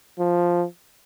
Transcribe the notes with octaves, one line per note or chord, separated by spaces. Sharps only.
F3